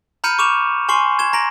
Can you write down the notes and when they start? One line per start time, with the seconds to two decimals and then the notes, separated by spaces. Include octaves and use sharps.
0.24 A#5 B5 F6 G6 C#7 D#7
0.39 C#6 D6 E7 F7
0.89 G#5 C6 C#6 C7 F#7
1.19 G#6 E7 G7
1.33 A#5 A#6 D7 F#7